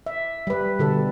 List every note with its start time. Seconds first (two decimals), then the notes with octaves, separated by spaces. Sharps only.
0.06 E5
0.47 G3 B4
0.79 B2 D3 A4